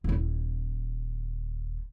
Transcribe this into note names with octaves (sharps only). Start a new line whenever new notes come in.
D#1 E4